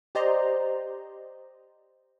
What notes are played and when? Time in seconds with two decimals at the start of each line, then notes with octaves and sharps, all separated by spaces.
0.15 G4 C5 D5 D#5 A#5 C6